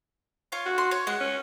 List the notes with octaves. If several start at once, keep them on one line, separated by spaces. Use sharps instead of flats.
F4 C#5 F5
F#4
C6
C#5
G#3 F#5
C#4